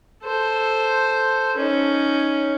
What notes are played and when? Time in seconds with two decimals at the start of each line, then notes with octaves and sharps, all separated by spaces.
0.23 A4 C5
1.57 C#4 D#4